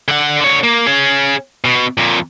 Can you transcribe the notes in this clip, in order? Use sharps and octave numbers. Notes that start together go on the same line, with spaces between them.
D3 F#5
D3 C#5
A#3
C#4 G#4
B2
F2 A#2